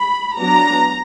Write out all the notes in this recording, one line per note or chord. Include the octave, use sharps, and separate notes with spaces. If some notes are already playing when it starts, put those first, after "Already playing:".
Already playing: B5
F#3 B3 D4 A#5